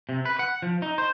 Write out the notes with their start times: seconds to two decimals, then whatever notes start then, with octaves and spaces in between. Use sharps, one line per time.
0.09 C3
0.25 B4
0.39 F#5
0.62 F3
0.82 D#4
0.98 C5